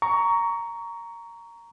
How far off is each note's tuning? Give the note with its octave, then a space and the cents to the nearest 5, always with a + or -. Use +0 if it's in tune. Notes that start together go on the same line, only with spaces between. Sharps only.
A#5 +0 C#6 +20